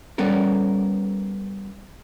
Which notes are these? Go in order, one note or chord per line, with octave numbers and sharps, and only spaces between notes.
G3 B3 C#4 A4 A#4